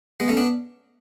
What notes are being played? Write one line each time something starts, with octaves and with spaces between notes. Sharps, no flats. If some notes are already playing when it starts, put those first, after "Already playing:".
G#3 B3
A3 C#4
B3 D4